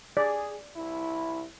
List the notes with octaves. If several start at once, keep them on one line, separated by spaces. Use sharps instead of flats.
G#4 D5
C2 E4